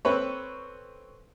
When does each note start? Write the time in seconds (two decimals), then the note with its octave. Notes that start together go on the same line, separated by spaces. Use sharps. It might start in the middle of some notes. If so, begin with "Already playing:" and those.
0.05 C4 A4 B4 C#5